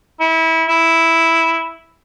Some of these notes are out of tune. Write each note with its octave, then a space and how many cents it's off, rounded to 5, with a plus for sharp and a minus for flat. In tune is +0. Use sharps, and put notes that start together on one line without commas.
E4 -25
E4 -5